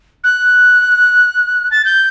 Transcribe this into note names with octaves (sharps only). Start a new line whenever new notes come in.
F#6
A6
G6